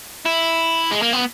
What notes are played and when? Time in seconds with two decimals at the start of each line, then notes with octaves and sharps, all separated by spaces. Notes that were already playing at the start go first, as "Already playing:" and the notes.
0.26 E4
0.92 G#3
1.02 A#3
1.13 B3